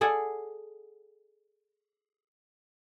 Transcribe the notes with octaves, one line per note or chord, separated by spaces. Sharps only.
G#4 A4 D5 F#5 G#5